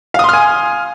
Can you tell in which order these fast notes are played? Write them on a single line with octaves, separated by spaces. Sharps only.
F5 D#6 C6 F6 G#5